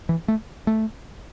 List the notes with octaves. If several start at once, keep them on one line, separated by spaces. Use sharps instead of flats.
E3
A3
A3